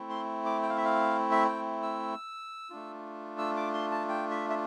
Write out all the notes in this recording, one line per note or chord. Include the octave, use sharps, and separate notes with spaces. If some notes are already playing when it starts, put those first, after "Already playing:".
Already playing: A3 C4 E4
C6
D6
G5
F5
E5
F5
E5
G5
E6
A3 D4 F4
E6
D6
C6
A5
G5
E5
E5